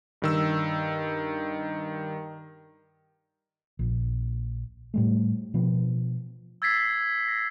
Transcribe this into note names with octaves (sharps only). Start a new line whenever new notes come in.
G2 D#3 E6
A#1
A2 G3 A3
B2 F3 B3
E6 G#6 A6 B6 C7
A#6